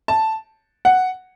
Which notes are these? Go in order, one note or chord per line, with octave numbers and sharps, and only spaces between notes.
A5
F#5